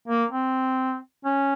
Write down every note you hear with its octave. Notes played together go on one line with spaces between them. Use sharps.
A#3
C4
C#4